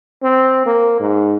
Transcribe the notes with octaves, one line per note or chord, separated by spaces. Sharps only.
C4
A#3
G#2